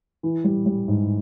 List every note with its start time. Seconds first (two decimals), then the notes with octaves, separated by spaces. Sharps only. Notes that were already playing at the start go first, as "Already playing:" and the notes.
0.23 E3
0.44 G3
0.66 G3
0.88 G#2